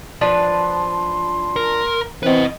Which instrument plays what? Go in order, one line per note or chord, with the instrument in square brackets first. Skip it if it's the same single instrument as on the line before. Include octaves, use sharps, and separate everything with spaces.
[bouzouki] F3 D4 B4 [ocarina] C6
[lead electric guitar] A#4
[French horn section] E3 C4 [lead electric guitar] B4 D#5